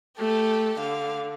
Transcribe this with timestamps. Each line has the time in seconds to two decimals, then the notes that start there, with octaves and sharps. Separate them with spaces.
0.18 A3 G4 A4
0.80 D3 F5